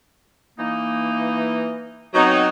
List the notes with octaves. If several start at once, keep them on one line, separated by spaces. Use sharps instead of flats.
E3 A#3 D#4
F#3 B3 C4 D#4 C#5